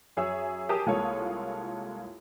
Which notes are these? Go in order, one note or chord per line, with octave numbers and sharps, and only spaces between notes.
F#2 G#4 C#5 E5 E6
G4 G#4 A#4 G5 A5 D#6
C2 G#3 A#3 F4 A4 C#5